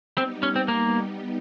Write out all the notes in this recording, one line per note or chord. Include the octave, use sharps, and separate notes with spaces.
G3 B3 C4 D#4 G4
C#4
C4
A#3